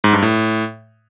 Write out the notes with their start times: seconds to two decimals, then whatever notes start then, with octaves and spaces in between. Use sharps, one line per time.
0.04 G#2
0.13 G2
0.23 A2